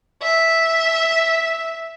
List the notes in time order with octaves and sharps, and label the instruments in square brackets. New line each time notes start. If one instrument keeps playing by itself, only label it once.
[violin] E5